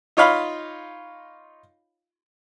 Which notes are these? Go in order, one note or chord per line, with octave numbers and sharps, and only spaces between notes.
D#4 F4 C#5 D#5 F5 B5